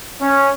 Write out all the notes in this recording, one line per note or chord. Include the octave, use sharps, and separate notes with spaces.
C#4